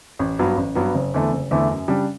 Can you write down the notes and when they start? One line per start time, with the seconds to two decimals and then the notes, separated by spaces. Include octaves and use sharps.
0.19 A1
0.39 G2 F#3 B3
0.57 A1
0.75 G2 F#3 B3
0.95 F#1
1.14 E2 D3 A3 E4
1.32 F#1
1.51 E2 D3 A3 E4
1.70 F#2
1.88 C#3 G3 D4